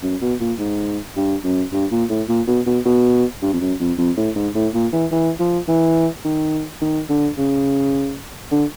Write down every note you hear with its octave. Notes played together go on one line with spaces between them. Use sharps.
F#2
B2
A#2
G#2
G2
F#2
G2
A#2
A2
A#2
B2
B2
B2
G2
F2
F#2
F2
F2
A2
G#2
A2
A#2
E3
E3
F3
E3
D#3
D#3
D3
C#3
D3